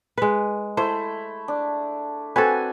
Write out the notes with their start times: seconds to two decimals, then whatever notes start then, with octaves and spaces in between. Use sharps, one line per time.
0.18 G#3 B4
0.77 A3 E4 C5
1.48 D4
2.36 C4 F#4 A4 B4 G#5